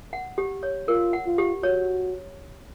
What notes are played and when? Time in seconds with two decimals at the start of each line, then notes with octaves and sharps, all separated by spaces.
0.13 F#5
0.38 G4
0.63 C#5
0.88 F4 A#4
1.13 F#5
1.26 F4
1.38 G4
1.63 F#4 C#5